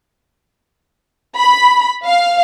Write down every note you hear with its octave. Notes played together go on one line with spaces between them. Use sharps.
B5
F5